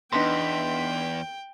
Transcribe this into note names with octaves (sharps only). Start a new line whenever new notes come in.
E2 B3 D4 D#4 G5 C6 B6